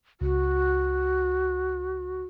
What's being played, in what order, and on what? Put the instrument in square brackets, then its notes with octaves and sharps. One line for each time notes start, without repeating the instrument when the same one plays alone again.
[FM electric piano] C#2 [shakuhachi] F#4